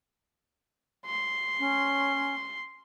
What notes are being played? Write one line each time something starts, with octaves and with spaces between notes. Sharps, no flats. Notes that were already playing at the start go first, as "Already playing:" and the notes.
C6
C#4